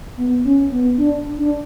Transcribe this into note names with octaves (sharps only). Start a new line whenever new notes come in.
B3
C#4
B3
D4
D4